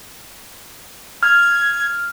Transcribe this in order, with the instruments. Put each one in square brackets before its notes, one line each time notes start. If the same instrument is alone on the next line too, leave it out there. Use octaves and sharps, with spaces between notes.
[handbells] F6 [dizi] G#6